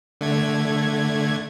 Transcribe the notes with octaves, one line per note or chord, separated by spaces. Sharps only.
D3 A3 G#6